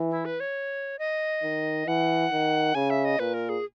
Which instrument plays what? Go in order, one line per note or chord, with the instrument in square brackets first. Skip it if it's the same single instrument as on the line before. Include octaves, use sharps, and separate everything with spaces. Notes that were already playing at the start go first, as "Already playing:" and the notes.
Already playing: [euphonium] E3
[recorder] E4
B4
C#5
D#5
[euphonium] D#3
[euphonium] E3 [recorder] F#5
[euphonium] D#3
[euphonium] C#3 [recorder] G#5
[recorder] E5
D#5
[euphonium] A#2 [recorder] B4
[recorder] A#4
G#4